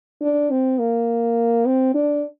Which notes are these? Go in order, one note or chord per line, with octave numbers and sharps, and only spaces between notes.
D4
C4
A#3
C4
D4